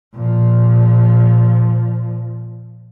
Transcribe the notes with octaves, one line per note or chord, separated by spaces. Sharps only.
A#2 F3